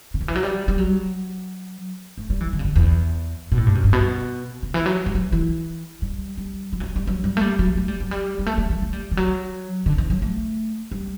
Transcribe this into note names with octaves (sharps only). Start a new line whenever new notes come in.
C#3
D3
E3
F#3
G3
G3
F#3
A3
G3
E3
D3
C#3
D3
E2
B2
A2
G2
F#2
G2
B2
C#3
E3
F#3
G3
F#3
E3
G3
G3
F#3
E3
F#3
G3
F#3
G3
A3
G3
F#3
A3
G3
F#3
G3
G3
A3
G3
E3
A3
G3
E3
F#3
D3
E3
F#3
A3
G3